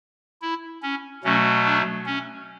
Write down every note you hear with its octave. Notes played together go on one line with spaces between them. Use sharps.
E4
C#4
B2 F#3 A3 C#4
D4
C#4